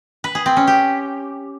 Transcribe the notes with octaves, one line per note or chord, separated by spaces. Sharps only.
B4
G#4
C4
C#4
G4